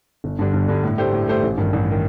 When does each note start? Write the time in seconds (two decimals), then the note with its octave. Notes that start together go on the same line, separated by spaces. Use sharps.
0.24 G1
0.39 G2 D3 G3 D4
0.53 G1
0.68 G2 D3 G3 D4
0.83 A2
0.98 A3 D4 G4 C5
1.13 A2
1.28 A3 D4 G4 C5
1.43 A1
1.58 G2 D#3
1.73 A1
1.91 D#3